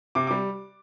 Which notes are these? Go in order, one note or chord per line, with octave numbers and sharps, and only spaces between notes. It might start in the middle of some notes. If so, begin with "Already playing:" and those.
C3 D6
D6
G3